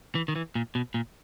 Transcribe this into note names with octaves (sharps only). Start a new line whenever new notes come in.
E3
D#3
E3
A#2
B2
A#2